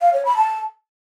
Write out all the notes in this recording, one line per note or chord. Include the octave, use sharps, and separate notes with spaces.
F5
C#5
B5
A5